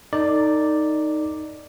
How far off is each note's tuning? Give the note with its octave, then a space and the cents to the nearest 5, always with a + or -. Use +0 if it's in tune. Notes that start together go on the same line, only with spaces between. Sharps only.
D#4 +0 A4 +35 D5 +0